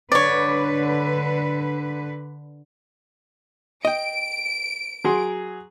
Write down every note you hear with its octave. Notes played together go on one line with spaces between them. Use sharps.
D3 B4 C#5 D5
D#5 G5 D7
F#3 G#4 C6